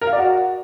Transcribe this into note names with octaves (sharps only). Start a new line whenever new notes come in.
A#4
F5
D5
F#4